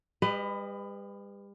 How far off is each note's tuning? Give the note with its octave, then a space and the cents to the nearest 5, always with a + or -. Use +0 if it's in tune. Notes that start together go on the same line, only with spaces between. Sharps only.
G3 +40 B4 +20 D#5 -10